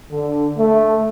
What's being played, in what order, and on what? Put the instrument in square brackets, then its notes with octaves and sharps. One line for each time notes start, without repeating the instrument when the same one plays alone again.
[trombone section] D3
A3